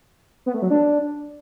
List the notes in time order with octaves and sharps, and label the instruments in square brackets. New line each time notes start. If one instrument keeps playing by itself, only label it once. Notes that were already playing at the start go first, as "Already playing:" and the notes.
[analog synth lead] B3
A3
F#3
D4